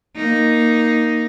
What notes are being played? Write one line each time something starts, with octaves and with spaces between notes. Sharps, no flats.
A#3 D#4